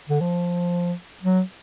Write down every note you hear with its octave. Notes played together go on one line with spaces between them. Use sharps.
D3
F3
F#3